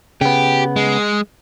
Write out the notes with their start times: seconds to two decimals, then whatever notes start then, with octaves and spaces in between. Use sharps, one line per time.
0.21 C#3 B3 G4
0.76 G#3